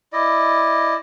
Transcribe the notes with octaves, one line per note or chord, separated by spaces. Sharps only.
E4 D5 D#5